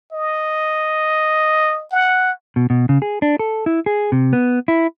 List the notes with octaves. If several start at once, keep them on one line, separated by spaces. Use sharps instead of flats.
D#5
F#5
B2
B2
C#3
G#4
D4
A4
E4
G#4
C3
B3
E4